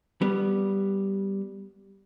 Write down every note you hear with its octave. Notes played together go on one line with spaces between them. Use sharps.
G3 B3